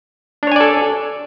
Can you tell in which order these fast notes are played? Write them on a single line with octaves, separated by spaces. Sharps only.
D4 C#5 G#5 D5 A4